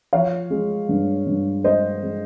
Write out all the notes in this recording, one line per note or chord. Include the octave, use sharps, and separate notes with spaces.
F3 C#5 F5
G#3
G2
G2
G#3 C5 D#5
G#3